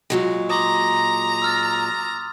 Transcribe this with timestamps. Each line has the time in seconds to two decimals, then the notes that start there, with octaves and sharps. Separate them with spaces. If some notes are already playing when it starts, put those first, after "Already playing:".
0.10 A#2 F#3 G#3
0.50 A#5 C6 D6 D#6
1.42 E6 F6 A6